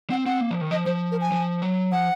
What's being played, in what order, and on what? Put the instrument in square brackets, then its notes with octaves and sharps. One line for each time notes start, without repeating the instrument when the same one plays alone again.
[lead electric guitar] C4 [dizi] F#5
[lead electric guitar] C4 [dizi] F#5
[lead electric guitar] A#3
F3
D#3
[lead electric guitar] F3 [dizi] D#5
[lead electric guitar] F3 [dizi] C5
[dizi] A#4
G#5
[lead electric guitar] F3
F#3
[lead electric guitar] F3 [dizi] F#5